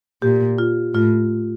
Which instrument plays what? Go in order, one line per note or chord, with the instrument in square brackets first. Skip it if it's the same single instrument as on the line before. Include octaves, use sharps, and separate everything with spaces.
[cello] A#2 [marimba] G4
[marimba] F4
[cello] A2 [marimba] F4